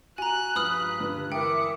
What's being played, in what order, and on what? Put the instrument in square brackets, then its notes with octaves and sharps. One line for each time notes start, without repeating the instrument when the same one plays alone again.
[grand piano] F#4 [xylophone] G#5 A#5 [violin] F#6
[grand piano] G2 F3 [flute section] B4 [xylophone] B5 D#6 F6
[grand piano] G2 D3
[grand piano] E3 A#4 [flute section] E5 D6 D#6 [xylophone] G5 [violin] C#7